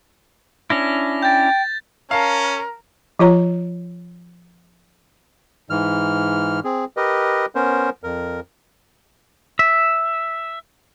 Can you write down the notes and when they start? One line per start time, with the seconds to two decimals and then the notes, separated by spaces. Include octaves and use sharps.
0.70 C#4 D4 E4 A#6
1.23 G5 G6 A6
2.11 C#4 A#4 F5 A5
3.19 F3 F4 C#5 A#5
5.70 G#2 E3 F6
6.64 C4 G#4
6.97 G4 A#4 B4 D#5
7.55 B3 C#4 A#4 C5
8.04 F2 A#4
9.59 E5